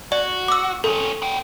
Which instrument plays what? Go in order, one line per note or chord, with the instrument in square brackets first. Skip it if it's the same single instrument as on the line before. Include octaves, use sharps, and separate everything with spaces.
[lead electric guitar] F#4 [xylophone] D5
[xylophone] D6 E6
[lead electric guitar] F2 C#4 [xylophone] A4
[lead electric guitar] B3 G5